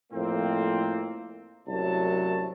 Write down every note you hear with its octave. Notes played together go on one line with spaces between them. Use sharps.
F2 A2 A#3 C4
C2 F#2 A2 F#3 A5